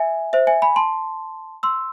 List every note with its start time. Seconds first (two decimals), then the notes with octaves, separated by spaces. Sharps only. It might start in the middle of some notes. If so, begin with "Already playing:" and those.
Already playing: E5 G#5
0.33 C5 E5
0.47 E5 G#5
0.62 G#5 B5
0.76 A5 C6
1.63 C6 E6